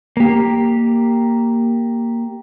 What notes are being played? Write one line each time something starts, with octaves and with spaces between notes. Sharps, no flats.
A#3 G4